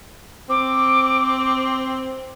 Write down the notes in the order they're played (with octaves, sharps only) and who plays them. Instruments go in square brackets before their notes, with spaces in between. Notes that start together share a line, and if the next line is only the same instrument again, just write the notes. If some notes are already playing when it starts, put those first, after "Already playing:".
[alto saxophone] C4 [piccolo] D6